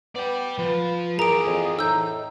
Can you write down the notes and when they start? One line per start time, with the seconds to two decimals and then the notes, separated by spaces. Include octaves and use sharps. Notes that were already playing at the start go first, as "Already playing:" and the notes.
0.15 B3 D5 G5
0.58 F3 B4
1.19 E3 G#4 A#4 D5 A#5 D7
1.46 F2
1.79 A2 D#4 E6 G6